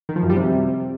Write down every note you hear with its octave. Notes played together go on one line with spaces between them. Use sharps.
D#3
F3
F#2
G3
C3